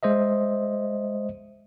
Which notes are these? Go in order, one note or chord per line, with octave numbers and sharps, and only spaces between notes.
G#3 C5 D#5 E5